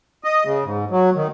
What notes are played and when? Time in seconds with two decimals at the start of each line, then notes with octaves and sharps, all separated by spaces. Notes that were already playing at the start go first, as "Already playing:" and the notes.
0.24 D#5
0.45 C#3
0.65 G#2
0.91 F#3
1.16 D#3